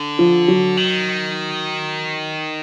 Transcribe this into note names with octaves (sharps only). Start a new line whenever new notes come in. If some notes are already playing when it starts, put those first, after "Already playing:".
Already playing: D3
F3
F#3
D#3